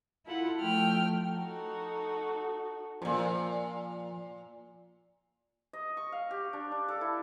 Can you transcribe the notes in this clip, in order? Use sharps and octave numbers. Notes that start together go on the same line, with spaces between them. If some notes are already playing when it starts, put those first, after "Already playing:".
E4 F4 A4 F#5
F3 A3 G5 F6
D#4 F#4 A4
F#2 A#2 F3 A#3
D#5
C#6
F5
G4
D4
D4
A4
E4